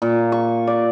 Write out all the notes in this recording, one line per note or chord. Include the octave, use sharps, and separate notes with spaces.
A#2
C#6
D5